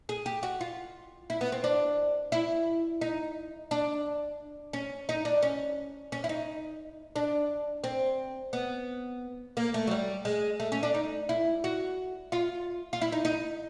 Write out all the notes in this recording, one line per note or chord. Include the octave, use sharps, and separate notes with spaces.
G#4
G4
F#4
F4
E4
B3
C4
D4
E4
D#4
D4
C#4
D#4
D4
C#4
C#4
E4
D#4
D4
C4
B3
A#3
A3
F#3
G3
G#3
A3
C#4
D4
D#4
E4
F#4
F4
F4
E4
D#4
D#4